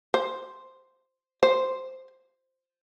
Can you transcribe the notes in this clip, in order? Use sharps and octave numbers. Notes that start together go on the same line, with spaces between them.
C5
C5